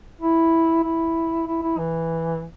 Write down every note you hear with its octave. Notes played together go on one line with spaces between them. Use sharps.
E4
E4
E4
E4
E3